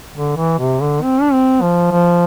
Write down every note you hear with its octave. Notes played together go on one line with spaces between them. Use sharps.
D3
E3
C3
D3
C4
D4
C4
F3
F3